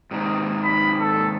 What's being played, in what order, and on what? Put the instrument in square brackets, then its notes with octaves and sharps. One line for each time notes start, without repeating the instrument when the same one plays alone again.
[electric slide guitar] G#2 C3 D#3
[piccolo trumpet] B5
A4